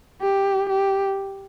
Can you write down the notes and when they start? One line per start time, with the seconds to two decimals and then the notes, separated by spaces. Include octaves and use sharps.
0.22 G4
0.70 G4